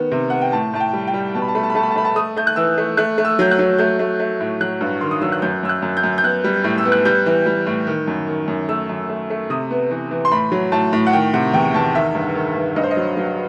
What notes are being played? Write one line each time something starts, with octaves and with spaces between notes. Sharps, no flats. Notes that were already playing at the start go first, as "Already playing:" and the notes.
Already playing: D#3 B3
C3
B3 F#5
G5
A2 A5
A2 A5
G5
G3
G5
G3
B2 A5
B5
A5
A3 B5
A5
B5
A3 A5
B5
A5
A3 B5
A5
A3 D#6
A3 G6
F#6
E3 E6
A3
A3 F#6
A3
E6
F#3 G6
F#6
F#3
A3 G6
A3
A3
A2
F#3 F#6
G2
D#3 C6
D#6
F#3 E6
F#6
F#2 G6
F#2 E6
F#6
F#2
G6
F#2
G6
B3 F#6
G3
A2
E6
B3
F#6
G3 G6
E3
G3
A2
D#3
F#2
D#3
F#2
A3 E6
F#2
A3
A3
C3 D#6
B3
E3
E3
C6
A2 B5
F#3
A2 A5
A2
F#5
D#3 G5
C3 F#5
E2 G5
E2 A5
D#3 E5
G2
D#3
G2
G2 D#5
C5
D#5
F#3
F#3